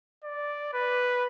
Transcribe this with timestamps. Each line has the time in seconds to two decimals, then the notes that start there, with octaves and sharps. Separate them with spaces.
0.24 D5
0.73 B4